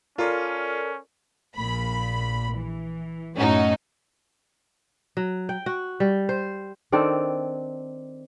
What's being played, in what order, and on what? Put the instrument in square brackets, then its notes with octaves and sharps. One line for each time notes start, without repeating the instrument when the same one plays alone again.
[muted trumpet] C#4 [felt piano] F4 [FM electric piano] A4 A#4 D5
[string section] A#1 A#2 B5
E3
F#2 A2 A3 C#4 D#4 F#4
[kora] F#3
G5
F#4
G3
C5
D#3 C4 D4 A4